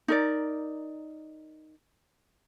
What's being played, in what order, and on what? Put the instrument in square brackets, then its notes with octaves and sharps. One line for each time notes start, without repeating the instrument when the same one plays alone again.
[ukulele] D#4 A#4 D5